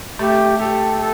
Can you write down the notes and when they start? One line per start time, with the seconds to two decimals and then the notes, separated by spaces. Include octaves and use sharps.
0.19 A3 G4
0.58 G4 A4
0.98 A4